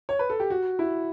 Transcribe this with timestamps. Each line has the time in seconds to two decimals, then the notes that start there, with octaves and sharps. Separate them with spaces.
0.09 C#5
0.19 B4
0.30 A4
0.40 G4
0.50 F#4
0.79 E4